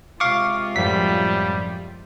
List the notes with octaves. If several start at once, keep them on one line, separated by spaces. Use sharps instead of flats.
C3 G#3 F4 F5 C#6 D6
F#2 A2 F3 G3 B6